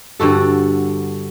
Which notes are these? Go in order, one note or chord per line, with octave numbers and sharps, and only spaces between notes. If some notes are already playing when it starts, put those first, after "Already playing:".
G2 D3 F#4 A4